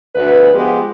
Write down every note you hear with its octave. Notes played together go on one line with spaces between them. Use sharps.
D2 B4
F3 G#3 B3 G4